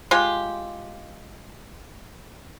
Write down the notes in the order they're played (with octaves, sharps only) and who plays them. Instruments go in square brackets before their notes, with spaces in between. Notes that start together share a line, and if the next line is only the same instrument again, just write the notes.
[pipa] G#3 F4 G4